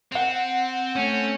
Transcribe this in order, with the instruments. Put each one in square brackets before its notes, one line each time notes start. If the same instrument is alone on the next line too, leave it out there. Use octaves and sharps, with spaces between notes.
[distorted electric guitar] C4 [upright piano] F#5 F7
[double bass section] A3 [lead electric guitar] C#4